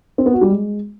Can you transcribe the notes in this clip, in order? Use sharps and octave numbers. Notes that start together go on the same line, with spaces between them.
C4
B3
F#4
G3
G#3